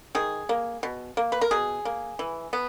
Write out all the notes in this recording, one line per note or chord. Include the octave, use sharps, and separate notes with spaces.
D#3 G#4
A#3
B2
A#3
B4
A#4
B2 G#4
A#3
E3
B3